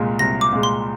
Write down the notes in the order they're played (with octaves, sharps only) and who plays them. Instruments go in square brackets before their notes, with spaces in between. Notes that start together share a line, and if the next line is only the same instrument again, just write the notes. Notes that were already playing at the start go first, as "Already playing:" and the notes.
Already playing: [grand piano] C2 A#2 G#3
[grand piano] C2 [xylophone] A#6
[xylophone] D6
[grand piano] A#2 G#3
[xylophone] C6